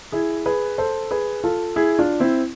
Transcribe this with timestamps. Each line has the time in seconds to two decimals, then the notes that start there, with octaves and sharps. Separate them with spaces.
0.12 E4 G#4
0.46 G#4 B4
0.78 A4 C5
1.11 G#4 B4
1.44 F4 A4
1.76 E4 G#4
1.99 D4 F4
2.20 C4 E4